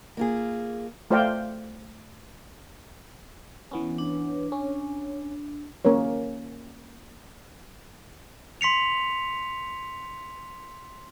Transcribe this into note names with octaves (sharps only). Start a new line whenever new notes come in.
A#3 F4 G#4
A3 F4 C5 D5 F5 G5
E3 B3 C#4
D4
C#4
A#3 C#4 A#4 C#5
C6 B6 C#7 F7